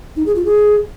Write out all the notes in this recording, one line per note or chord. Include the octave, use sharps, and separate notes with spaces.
D#4
G#4
F4
G#4